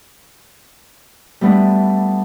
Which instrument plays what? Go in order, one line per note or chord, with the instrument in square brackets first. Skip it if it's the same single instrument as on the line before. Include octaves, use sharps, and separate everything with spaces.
[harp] G3 A3 B3 D4